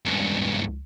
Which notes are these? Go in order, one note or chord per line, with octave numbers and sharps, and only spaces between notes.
C#2 G2